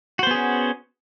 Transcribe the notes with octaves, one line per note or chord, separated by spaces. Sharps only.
B3 C#4 F#4 G#4 C5